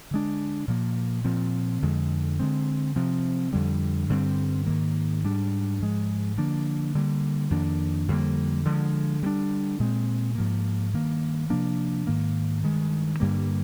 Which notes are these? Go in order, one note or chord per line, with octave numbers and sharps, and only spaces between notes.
D3 G#3 D4
A#2 F3 A#3
A#2 F3 C4
F2 D3 G#3
D3 G#3 C4
C3 F3 C4
F2 D3 G3
G2 D3 G3 C4
G#2 D#3 A#3
G#2 G3 D4
G#2 F3 G#3
D3 F3 A#3 D4
D3 G3 A#3
F2 D#3 A#3 D4
F2 D3 G3 A#3
D3 F3 G#3
D3 G3 A#3 D4
A#2 G#3 C4
G#2 F3 A#3
G2 D#3 A#3
C3 F3 A#3 D4
G#2 D#3 A#3
G2 D#3 G#3
G2 D3 G3 A#3